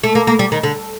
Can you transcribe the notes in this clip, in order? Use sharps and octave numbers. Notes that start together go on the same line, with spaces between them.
A3
A#3
A#3
G3
D#3
D3